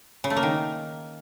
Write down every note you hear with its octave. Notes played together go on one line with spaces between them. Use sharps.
C#3
A3
A#3
D#3